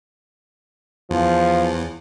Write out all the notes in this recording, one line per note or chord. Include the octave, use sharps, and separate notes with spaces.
E2 F3